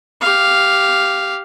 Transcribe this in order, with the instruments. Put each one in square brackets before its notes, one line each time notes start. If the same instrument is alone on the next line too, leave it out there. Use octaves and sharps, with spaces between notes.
[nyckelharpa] G4 F5